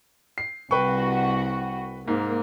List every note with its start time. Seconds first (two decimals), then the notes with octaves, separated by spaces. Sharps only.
0.38 C7
0.71 C2 F#4 B4 G5 C#6
2.08 G#2 A#3